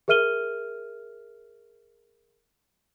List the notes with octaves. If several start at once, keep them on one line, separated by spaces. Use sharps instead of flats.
G#4 A#4 E5 F6 D#7 G7